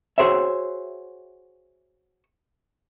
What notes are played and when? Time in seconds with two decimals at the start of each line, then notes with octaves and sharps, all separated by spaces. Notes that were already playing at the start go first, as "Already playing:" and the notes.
0.18 F#4 G#4 C5 C#5 E5